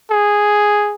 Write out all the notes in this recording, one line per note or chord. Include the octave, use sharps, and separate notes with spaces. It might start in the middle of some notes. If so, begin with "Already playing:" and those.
G#4